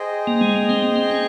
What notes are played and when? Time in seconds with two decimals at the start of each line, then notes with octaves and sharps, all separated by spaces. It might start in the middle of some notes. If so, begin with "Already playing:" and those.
Already playing: G#4 C5 D#5 G5
0.27 A#3
0.41 G#3
0.56 A#3
0.69 C4
0.82 A#3
0.96 C4
1.11 C#4